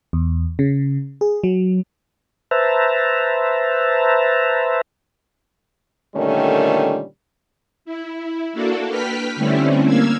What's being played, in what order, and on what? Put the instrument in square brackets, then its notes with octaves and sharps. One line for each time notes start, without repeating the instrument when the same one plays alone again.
[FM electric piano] E2
C#3
G#4
F#3
[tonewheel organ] B4 C5 E5 A5 A#5
[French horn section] A#2 D3 D#3 G3 A3 C#4
[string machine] E4
A#3 D4 F#4 A4
B4 G5 F6 B6
D3 G3 A3 C4 C#4 E4
A#3 F5 E6 G#6